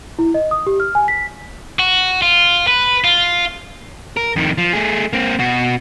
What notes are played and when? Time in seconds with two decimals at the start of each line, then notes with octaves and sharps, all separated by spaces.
0.19 E4
0.34 D#5
0.51 D#6
0.67 G4
0.80 F6
0.95 G#5
1.08 B6
1.79 F#4
2.22 F4
2.67 B4
3.04 F4
4.17 A#4
4.36 F2 D#3
4.58 F3
4.73 A3 G#4
5.13 A#3 C4
5.39 B2 F#4